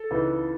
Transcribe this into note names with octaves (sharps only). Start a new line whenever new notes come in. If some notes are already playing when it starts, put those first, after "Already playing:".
Already playing: A4
C#2 C#3 E3 B3 D#4